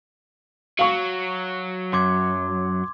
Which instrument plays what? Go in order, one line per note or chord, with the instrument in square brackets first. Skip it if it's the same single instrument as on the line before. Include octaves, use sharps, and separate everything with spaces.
[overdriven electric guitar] F#3 [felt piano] F5 C#6
[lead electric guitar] F#2 [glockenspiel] C6 D6 G#6